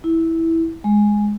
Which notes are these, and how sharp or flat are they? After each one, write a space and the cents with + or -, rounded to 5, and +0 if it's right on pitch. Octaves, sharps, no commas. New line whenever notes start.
E4 -10
G#3 +0